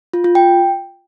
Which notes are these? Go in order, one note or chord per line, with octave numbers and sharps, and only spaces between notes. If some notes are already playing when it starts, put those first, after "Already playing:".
F4
F4
G5